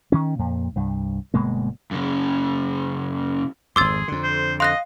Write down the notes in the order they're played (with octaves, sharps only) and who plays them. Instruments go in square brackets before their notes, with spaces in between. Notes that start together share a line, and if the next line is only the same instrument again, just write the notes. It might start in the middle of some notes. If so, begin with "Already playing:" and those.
[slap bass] D#3 C#4
F2 A#2
C2 G2
G1 B2 G#3 A#3
[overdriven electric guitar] F#2 C#3
[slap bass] G#1 F2 [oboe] G#4 [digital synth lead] C6 [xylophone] D6 E6 A6
[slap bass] F2 D3
[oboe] C5
[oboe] D#5 [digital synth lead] F5 [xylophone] C6 F#6 A#6